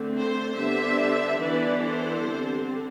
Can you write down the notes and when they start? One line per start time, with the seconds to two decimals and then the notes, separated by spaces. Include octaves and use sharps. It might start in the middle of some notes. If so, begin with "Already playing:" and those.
Already playing: D3 A3 C4
0.15 A4 C5
0.57 D3 G3 B3 D4 C5 E5
1.40 E3 B3 D4 B4 D5
1.82 A4 C5
2.24 D3 G3 C4